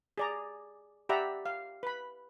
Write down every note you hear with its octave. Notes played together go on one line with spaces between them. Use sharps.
G#4 D5 A#5
G4 D5 E5 F#5 A#5 B5
F5
B4 B5